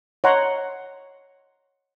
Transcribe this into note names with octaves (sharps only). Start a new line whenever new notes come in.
C#5 D#5 F#5 A#5 C6